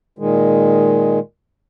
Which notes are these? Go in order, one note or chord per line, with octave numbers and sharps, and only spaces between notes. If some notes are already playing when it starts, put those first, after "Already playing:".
A#2 D#3 G#3